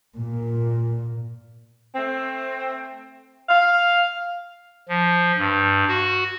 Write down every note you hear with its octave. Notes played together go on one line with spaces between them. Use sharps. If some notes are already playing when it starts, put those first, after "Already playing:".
A#2
A3 C4
F5
F3
G2
F#4